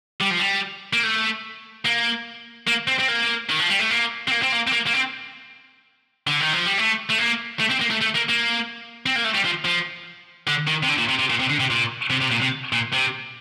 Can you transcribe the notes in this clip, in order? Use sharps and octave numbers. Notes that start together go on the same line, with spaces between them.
G3
F3
G3
A#3
A3
A#3
A#3
C4
C4
A#3
D#3
F3
G3
A3
A#3
C4
A#3
C4
A#3
C4
A#3
A#3
C4
D3
D#3
F3
G3
A3
A3
A#3
A3
C4
A#3
A3
A3
A#3
A#3
C4
A#3
A3
G3
F3
F3
D3
D#3
C3
D3
A#2
C3
C3
A#2
C3
D3
C3
A#2
C3
C3
A#2
C3
A#2
C3